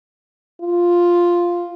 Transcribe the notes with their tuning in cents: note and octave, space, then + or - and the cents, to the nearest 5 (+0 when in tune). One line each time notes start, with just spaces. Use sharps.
F4 +0